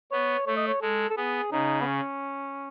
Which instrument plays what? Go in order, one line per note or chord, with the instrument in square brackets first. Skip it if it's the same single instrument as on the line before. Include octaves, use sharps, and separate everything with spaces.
[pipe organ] B3 [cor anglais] C#5
[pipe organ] A3 [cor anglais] C#5
[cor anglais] D#5
C#5
[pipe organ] G#3 [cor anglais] A4
[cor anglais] A4
[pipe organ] B3 [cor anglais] G#4
[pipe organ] C#3 [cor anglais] D#4
[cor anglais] B3
C#4